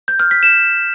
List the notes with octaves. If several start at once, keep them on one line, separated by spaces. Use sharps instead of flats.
G6
F6
B6
E7